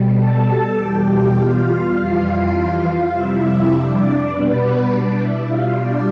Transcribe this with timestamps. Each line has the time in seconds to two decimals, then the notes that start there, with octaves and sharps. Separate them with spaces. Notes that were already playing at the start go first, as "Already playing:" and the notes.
Already playing: B2 G3
0.15 A4 A5
0.74 E2 B2 G3 G4 G5
1.03 G4 G5
1.33 F4 F5
1.92 F2 E3 G3
3.10 F2 C3 G3 E4 E5
3.69 D4 D5
4.28 B2 G3 B3 B4
4.87 D4 D5
5.17 E4 E5
5.46 B2 G3 F4 F5
5.76 D4 D5